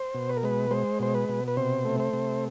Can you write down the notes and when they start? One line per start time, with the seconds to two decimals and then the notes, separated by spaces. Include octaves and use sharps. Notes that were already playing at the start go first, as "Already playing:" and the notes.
Already playing: C5
0.14 B2
0.29 B4
0.37 A#4
0.43 G#3 B4
0.71 G#3 C5
1.00 B2 C5
1.14 B4
1.29 B2
1.48 B4
1.57 C3 C5
1.85 A3
2.00 C5
2.13 C3